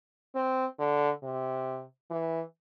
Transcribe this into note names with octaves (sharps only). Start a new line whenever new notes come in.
C4
D3
C3
E3